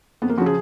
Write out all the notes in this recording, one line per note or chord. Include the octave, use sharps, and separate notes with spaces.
F2 B3
A#3
C#3 F3 F#4 G#4